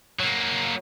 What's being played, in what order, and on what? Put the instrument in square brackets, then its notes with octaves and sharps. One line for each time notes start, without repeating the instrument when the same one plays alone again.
[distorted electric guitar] F#3 A#3